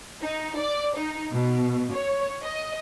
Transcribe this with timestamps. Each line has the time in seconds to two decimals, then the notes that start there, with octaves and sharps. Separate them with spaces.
0.21 D#4
0.57 D5
0.96 D#4
1.32 B2
1.93 C#5
2.43 D#5